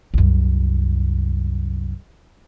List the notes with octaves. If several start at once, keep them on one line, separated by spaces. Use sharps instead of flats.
C2 F#2